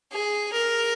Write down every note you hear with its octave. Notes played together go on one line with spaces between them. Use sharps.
G#4
A#4